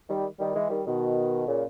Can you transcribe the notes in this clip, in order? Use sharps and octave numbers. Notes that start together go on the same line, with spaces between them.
D#3 G3
D#3 G3
E3 G#3
D#3 G3
B2 D#3
A#2 C#3